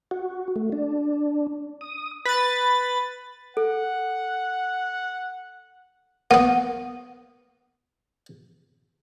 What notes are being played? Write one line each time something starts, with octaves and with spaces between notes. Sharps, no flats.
F#4
A3
D4
D#6
B4 A6
A4 F#5
A#3 B3 F#5